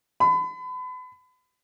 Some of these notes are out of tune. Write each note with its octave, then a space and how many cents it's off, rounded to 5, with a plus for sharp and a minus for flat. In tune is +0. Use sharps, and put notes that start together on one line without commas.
B5 +35